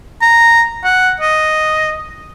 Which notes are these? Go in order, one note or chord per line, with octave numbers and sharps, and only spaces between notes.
A#5
F#5
D#5